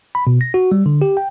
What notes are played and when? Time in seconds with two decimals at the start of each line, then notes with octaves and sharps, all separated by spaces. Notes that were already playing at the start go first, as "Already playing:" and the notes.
0.15 B5
0.27 B2
0.41 A#6
0.54 F#4
0.72 G3
0.86 D3
1.02 G4
1.17 G5